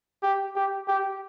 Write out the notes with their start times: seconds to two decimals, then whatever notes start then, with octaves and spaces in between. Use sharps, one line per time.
0.23 G4
0.56 G4
0.88 G4